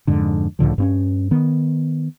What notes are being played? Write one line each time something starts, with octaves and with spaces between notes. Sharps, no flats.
F2 G#2 D3
C#2 A2 D3 F3
G2 C4 C#4
D#3 B3